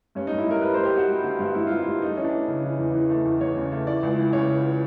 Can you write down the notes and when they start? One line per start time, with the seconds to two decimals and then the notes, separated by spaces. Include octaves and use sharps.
0.15 G2 C#4
0.27 D#4
0.32 G2
0.39 E4
0.47 G2 A#4
0.62 G3 B4
0.74 C5
0.78 G3
0.85 G4
0.94 G3 F#4
1.08 G3
1.24 D3
1.39 G2
1.55 G2 E4
1.67 G3 F4
1.80 E4
1.86 G2
2.02 A3 D#4
2.17 E3 C#4
2.24 D4
2.32 A3
2.48 C#3
2.64 E3
2.79 E2
2.95 E3
3.10 A3
3.25 E2
3.41 E2 C#5
3.56 C#3
3.72 A3
3.87 E3 D5
4.03 C#2
4.19 E3
4.33 C#3 C#5